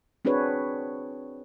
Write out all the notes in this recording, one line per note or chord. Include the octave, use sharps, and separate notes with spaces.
C4 D4 F#4 G#4 B4 C#5